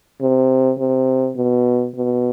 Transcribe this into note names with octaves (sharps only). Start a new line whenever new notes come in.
C3
C3
B2
B2